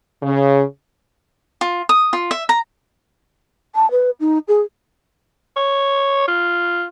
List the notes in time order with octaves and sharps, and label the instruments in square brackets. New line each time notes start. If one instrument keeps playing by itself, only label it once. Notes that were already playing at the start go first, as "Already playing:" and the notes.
[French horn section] C#3
[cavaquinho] F4
D#6
F4
E5
A#5
[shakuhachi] A5
B4
D#4
G#4
[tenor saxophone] C#5
F4